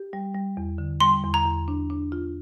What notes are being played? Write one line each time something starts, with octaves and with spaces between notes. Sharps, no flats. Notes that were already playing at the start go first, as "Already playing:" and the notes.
Already playing: G4
G3
G3
E2
D3
G3 C6
E2
A#5
E2
D4
D4
F4